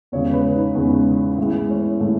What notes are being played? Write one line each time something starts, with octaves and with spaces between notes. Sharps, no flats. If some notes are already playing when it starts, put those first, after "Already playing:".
E2 C#3 G#3 C#5
B4
D#4
E2 C#3 G#3
A2 E3 G#3
C#4
A2 E3 G#3 A3